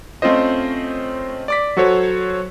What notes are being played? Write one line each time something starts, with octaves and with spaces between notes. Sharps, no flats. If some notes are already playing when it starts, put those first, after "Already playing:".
A3 C4 C#4 F4 C5 D#5
D5 D6 B6
F#3 F#4 A4 C5 C#5